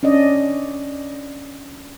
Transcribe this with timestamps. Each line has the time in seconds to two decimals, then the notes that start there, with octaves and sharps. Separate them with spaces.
0.03 C#4 D4 D5 D#5